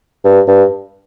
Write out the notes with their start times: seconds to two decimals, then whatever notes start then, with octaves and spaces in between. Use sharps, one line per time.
0.25 G2
0.48 G2